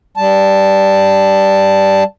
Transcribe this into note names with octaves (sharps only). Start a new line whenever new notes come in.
G3 A5